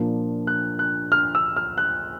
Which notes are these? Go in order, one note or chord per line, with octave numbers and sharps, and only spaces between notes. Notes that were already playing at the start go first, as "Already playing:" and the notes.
Already playing: A#2 F3 A#3 D4
F#6
F#6
F6
E6
F6
F#6